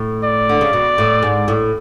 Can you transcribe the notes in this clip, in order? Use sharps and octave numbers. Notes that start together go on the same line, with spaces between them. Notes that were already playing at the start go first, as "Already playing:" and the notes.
Already playing: A2
D5
D3
C#3
B2
A2
G#2
A2